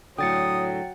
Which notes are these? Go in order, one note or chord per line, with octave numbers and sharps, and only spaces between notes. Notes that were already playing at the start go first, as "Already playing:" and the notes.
A2 D3 F#3 G5 D#6 A6 C#7